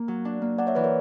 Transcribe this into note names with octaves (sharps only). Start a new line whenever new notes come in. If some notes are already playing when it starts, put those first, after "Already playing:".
Already playing: A#3
F#3
D4
A#3
D4 D5 F#5
C#5 E5
E3 B4 D5
A#4 C#5